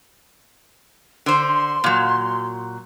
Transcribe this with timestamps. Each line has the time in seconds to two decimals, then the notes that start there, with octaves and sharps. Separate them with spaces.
1.26 D3 C5 C6
1.84 A#2 F#3